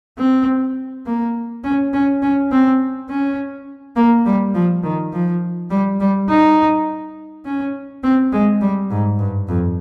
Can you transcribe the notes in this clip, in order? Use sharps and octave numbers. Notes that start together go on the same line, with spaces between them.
C4
A#3
C#4
C#4
C#4
C4
C#4
A#3
G3
F3
D#3
F3
G3
G3
D#4
C#4
C4
G#3
G3
G#2
G2
F2